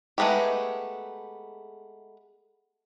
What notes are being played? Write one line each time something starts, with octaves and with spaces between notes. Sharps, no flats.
G#3 A3 B3 D#4 G4